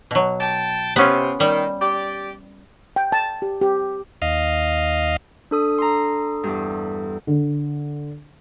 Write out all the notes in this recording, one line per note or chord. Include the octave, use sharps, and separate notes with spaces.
B2 F#3
G5 A5
C3 B3 C#4 F4
D#3 G3
G4 D5
G5
A5
G4
G4
D#2 D#5 F5
D4 A4 D#6
A#5 C6
E2 G2
D3